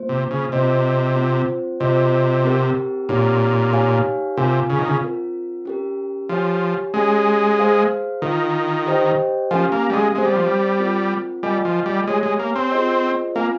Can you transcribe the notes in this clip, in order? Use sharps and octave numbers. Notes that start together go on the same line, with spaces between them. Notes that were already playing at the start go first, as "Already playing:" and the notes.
Already playing: A#3 F4 C5
C3
C#3
C3 C4 F4 C5 D#5
C4 F4 C5
C3 F4 C5 D#5
C4 G4 A#4
A#2 C4 D#4 G4 C#5
D#4 G4 C#5 F5 G#5
C3 F4 A#4 F5 G#5
C#3
D#3
C#3
C4 F4 A#4
C#4 G4 A#4
F3 G4 C#5 G#5
G#3 C#4 G4 C#5 G#5
G#4 C5 F5
D#3 F4 A#4 F5
G4 C5 D#5 G5
F3 C#4 G4 A#4 F5 G#5
A#3
G3
G#3
G#3 C4 G4 C5
G3
F3
G3
C4 F4 A#4
G3 F4 A#4 D#5 G#5
F3
G3
G#3 G4 C#5 G#5
G#3
A#3
C4
F4 G#4 C5 D#5
A#3 C4 F4 A#4 F5 G#5